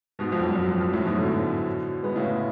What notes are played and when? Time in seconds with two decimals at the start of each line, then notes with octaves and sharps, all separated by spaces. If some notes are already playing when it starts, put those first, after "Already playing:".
0.19 G#2 B2
0.32 F2 G#2
0.44 F#2
0.56 F#2
0.68 F2
0.81 F#2
0.93 F#2 A2
1.05 G#2 B2
1.18 B2 D3
2.03 G#3 B3
2.16 A2 C#3